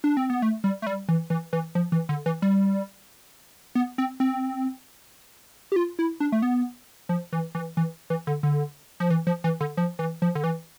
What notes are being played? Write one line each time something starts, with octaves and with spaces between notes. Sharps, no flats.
D4
C4
B3
A3
G3
A3
G3
E3
E3
E3
F3
E3
D3
E3
G3
B3
C4
C4
G4
F4
E4
D4
A3
B3
F3
E3
E3
E3
E3
D3
D3
F3
E3
F3
E3
D3
F3
E3
F3
D3
E3